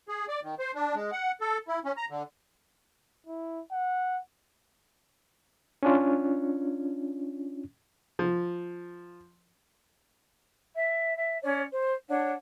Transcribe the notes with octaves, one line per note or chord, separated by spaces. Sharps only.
G#4
D5
D#3
C5
D4
G#3
F#5
A4
E4
C#4
A#5
D3
E4
F#5
C#4 D4 F4
F3
E5
E5
C#4 C#5 D5
C5
D4 C#5 F#5